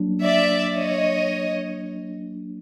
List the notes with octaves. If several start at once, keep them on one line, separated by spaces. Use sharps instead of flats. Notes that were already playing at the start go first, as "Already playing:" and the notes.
Already playing: F#3 A#3 D4
D5 E5
C#5 D#5